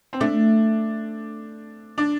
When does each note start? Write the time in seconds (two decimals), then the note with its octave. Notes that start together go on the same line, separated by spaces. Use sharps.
0.13 C4
0.20 A3 D4
1.98 D4